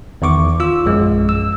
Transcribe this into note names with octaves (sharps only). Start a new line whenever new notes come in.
E2 D#3 C#6 D6
F4 E6
A#1 F#2 G#3
E6